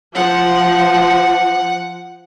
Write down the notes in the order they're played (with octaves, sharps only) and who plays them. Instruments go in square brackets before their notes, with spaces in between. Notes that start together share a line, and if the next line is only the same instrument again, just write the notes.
[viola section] F3 [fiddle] F#5